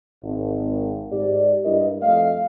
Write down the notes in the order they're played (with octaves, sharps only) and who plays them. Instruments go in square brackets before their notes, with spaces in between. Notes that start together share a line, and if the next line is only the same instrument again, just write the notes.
[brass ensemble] G#1
G#2 G4 D5
G2 E4 A#4 D5 D#5
F2 A3 D#5 F5